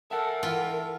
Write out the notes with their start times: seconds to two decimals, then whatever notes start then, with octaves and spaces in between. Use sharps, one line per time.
0.11 A4 A#4 E5 F#5
0.43 E3 F4 A4 G5